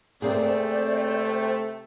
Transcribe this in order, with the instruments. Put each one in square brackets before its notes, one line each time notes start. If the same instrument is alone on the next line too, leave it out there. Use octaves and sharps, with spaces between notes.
[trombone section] C3 A3 [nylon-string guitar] A#3 C4 G#4 [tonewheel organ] C5 G5 [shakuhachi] D5